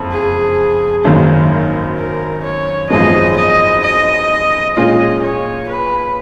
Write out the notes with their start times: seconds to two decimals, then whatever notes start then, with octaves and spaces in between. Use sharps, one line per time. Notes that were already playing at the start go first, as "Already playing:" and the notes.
Already playing: F#1 F2
0.11 G#4
1.04 G#1 F#2 D#3 A#3 A#4
1.97 A#4
2.44 C#5
2.90 G#1 F#2 F3 G#3 B3 D#5
3.37 D#5
3.83 D#5
4.77 A#2 G#3 C#4 F4 D#5
5.22 C#5
5.69 B4